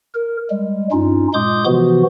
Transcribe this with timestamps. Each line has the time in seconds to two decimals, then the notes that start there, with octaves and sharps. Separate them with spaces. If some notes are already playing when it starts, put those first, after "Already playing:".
0.14 A#4
0.50 G3 G#3
0.92 G2 C#4 D#4 F4
1.34 A#2 G#3 C6 D6 D#6 G6
1.66 C3 E3 F3 B3 F#4